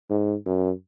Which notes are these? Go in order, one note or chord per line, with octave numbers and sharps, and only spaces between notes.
G#2
F#2